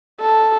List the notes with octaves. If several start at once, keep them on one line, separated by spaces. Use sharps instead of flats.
A4